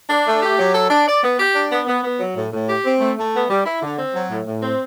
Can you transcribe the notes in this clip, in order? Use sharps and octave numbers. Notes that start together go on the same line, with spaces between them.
D4
A3
G4
F#3
A4
D4
D5
B3
G4
D4
B3
B3
B3
F#3
A2
A2
G4
C4
A3
A3
B3
G3
E4
D3
C4
F#3
A2
A2
C4